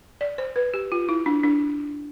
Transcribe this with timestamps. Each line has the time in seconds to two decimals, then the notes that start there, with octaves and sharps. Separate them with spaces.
0.21 D5
0.38 C5
0.56 B4
0.74 G4
0.92 F4
1.09 E4
1.26 D4
1.43 D4